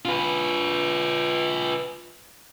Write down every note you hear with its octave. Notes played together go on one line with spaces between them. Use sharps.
F4 B4